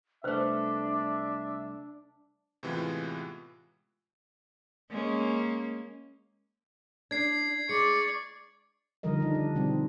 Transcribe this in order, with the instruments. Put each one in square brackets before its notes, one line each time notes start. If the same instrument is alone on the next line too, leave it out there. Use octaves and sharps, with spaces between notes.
[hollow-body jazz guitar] C2 A3 [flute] D4 [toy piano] B4 C5 [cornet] E5
[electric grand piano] A2 C3 E3 G#3 B3 F4
[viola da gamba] G#3 A#3 C#4
[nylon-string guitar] D4 [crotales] G#6 C7
[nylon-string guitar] G#3 [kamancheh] D5 C#6 [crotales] C#7
[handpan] D3 D#3 F3 G3 A#4 D#5
D4 D#4
D4
B2 G3 C4